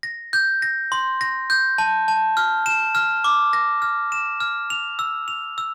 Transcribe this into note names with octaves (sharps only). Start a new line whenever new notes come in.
A#6
G6
A#6
C6
A#6
G6
A5
A5
F6
E7
F6
D6
A#6
F6
E7
F6
F7
E6
F7
E6